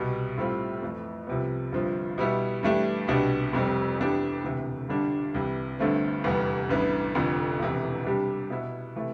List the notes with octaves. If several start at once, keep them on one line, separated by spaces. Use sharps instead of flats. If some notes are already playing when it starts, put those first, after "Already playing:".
Already playing: C2 B2 G3
A2 G3 C4 F4
F2 E3 A3
C2 C3 F3 B3
G1 G2 F3 C4
B2 G3 B3 E4
G2 E3 A3 D4 G4
C2 B2 B3 D4 G4
F1 F2 C3 G3 C4
F2 E3 B3 D4 G4
E1 D2 C3 E3
G1 G2 D3 G3 D4
C2 C3 E3 G3
G1 G2 D3 A3 C4
F1 E2 C3 G3 B3
A1 G2 E3 B3
F1 F2 D3 F3
E1 E2 C3 E3
C3 G3 D4 G4
B2 B3 E4 B4
C3 E3 A3 E4